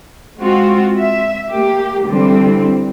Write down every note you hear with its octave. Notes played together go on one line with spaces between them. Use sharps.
G#3 C4 F4 F#4
E5
A#3 G4
D3 E3 G3 C4